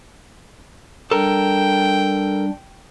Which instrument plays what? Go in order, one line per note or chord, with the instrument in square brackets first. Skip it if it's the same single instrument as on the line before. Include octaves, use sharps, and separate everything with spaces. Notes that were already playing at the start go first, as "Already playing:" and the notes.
[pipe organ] G3 D4 [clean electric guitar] A4 A#4 [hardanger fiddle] G5